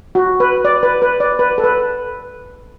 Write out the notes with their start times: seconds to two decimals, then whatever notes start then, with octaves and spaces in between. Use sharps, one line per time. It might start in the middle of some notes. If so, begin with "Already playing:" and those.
0.15 F#4
0.40 B4
0.65 D5
0.83 B4
1.02 B4
1.20 D5
1.39 B4
1.58 A4
1.64 B4